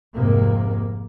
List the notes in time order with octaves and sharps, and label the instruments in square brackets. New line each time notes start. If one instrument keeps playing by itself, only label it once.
[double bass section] F1 G#2 C3 A#3